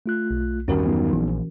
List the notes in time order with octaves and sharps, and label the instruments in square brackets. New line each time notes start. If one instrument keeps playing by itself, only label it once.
[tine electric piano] A3 F4 F#6
[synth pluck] B1
[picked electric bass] E2 G2 D#3 [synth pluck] C#4 F#4 A#4
[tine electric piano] F#3 B3 D#4
[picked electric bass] A#1 [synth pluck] E3